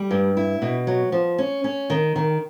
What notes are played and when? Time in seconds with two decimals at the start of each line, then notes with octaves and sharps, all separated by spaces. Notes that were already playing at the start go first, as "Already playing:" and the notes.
Already playing: G3
0.11 G2
0.37 E4
0.62 B2
0.87 F#3
1.12 F3
1.38 C#4
1.64 C#4
1.90 D#3
2.16 D#3